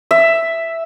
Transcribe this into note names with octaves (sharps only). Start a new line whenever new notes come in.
E5